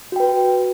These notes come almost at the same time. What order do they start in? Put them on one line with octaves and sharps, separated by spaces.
F#4 G5 B4